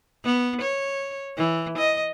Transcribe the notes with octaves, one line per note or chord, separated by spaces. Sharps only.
B3
C#5
E3
D#5